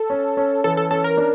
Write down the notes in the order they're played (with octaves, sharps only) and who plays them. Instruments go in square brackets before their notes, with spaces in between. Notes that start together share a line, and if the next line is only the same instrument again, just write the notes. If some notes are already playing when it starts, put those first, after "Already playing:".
Already playing: [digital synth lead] A4
[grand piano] C#4
C#4
[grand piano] E3 [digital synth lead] A4
[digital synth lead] A4
[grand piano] C#4 [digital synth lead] A4
[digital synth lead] A#4
[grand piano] D4